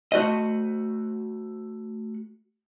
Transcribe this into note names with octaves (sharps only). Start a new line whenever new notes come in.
A3 F#4 C5 D#5